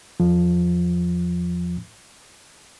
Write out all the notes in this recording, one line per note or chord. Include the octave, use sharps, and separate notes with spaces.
E2 F3